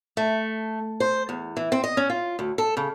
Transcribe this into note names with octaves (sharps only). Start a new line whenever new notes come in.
A3
C5
E2
E3
C4
D#5
C#4
F4
D2
A4
C#3